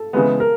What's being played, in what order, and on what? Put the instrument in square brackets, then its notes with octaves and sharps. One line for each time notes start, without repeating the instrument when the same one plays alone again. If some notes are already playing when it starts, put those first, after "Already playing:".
Already playing: [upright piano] A4
[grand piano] C#3 E3 G#3 B3
[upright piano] A#4